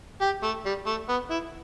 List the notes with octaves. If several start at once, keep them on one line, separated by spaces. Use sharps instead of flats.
G4
A3
G3
A3
B3
E4